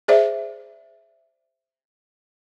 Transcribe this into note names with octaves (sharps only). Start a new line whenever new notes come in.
G#4 C5 D5 E5